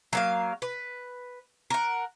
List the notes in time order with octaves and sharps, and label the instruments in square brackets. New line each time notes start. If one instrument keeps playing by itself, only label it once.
[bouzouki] F#3 A#3 F5
B4
A#4 F#5